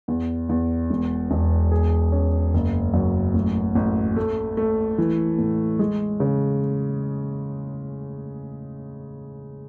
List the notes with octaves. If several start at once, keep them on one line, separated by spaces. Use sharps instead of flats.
E2
E2
E1
E1
G#4
C#4
F#1
F#2
A1
A1
A3
A3
E3
A2
G#3
C#3